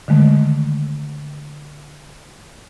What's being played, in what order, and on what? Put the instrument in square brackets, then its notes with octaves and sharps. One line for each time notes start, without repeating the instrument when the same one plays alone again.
[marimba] D3 D#3 G#3 A3